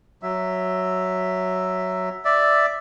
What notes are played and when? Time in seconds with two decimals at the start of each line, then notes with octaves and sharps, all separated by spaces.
0.22 F#3 E5
2.25 D5 E5